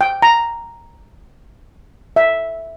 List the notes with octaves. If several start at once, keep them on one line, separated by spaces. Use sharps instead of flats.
G5
A#5
E5